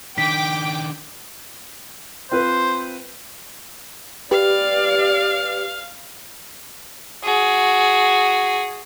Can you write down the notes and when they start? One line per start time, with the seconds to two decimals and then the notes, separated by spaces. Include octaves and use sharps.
0.18 D#3 D4 G5 D6 B6
2.32 C4 F4 B4 C5
4.31 G4 B4 D5 F5
7.23 F#4 G#4